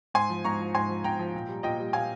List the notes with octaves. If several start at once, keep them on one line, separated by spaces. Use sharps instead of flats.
G#2 G#5 C6
F3
G#2 A#5 C#6
F3
G#2 G#5 C6
F3
G#2 G5 A#5
F3
A#2
G3
A#2 D#5 G5
G3
A#2 F5 G#5